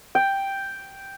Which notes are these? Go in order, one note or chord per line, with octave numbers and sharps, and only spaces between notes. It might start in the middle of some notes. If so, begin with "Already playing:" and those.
G5